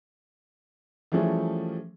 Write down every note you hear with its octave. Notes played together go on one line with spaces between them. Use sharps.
E3 F3 G3 A3 C#4 G#4